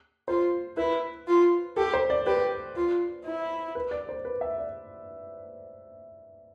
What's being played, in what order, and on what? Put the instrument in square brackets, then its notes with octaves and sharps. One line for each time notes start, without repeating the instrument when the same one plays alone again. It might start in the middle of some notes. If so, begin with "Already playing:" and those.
[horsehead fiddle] F4 [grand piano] C5
[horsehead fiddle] E4 [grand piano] B4
[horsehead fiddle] F4
[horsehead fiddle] G4 [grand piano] A4
[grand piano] C5
D5
[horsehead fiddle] G4 [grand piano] B4
[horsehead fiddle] F4
E4
[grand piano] B4
D5
C5
B4
E5
D5